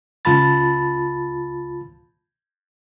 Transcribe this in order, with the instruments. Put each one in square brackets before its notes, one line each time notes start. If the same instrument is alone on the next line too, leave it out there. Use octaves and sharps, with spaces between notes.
[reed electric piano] C#2 F4 A5 B5 A6